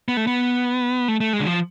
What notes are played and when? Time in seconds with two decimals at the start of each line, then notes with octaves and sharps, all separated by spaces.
0.08 B3
0.17 A3
0.27 B3
1.08 A3
1.21 A3
1.33 G#3
1.40 D3
1.46 F3